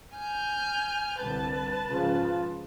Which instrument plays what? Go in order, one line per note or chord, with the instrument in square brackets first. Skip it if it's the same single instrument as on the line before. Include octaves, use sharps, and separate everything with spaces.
[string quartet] G#5 F6 G6
[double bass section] C2 D3 G3 [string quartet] B4 A5
[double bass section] G#2 C#3 F3 [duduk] F4